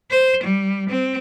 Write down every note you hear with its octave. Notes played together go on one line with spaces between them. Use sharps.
C5
G3
C4